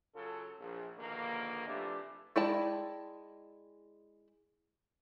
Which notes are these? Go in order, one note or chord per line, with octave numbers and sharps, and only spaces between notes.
C#3 F#3 F4 A4
A#1
A#1 B2 D3 D#3 A#3
C3 E3 F3 A3 D4 G4
G#3 E4 D5 G5 A5